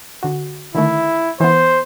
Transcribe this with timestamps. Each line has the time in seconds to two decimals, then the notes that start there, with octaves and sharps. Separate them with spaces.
0.23 D3 F#4
0.75 D3 D#3 A3 E4
1.40 E3 B3 C5